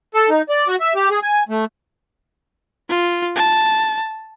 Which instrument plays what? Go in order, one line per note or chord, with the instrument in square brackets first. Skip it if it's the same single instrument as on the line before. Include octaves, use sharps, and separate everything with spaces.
[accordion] A4
D#4
D5
F#4
E5
G4
G#4
G#5
A3
[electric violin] F4
A5